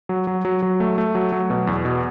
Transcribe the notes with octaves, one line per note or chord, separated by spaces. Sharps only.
F#3
F#3
F#3
F#3
A3
A3
F#3
F#3
B2
E2
B2